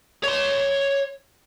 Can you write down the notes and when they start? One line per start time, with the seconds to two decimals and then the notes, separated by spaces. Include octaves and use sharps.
0.24 C#5 C6